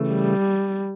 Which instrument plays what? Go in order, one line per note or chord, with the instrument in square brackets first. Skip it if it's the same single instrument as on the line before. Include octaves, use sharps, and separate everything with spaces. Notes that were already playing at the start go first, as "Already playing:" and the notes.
Already playing: [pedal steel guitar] C#3 E3 A3
[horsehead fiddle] G3